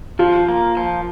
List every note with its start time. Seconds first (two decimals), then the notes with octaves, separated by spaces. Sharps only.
0.19 F3 F4
0.48 A#3
0.77 F3